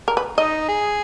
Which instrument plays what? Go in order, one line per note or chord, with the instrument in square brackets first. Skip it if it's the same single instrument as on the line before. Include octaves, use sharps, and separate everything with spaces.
[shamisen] A#4
B4
[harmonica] D#4 [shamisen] D#5
[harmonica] G#4